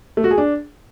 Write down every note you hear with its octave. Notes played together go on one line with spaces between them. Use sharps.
A3
F#4
G#4
D4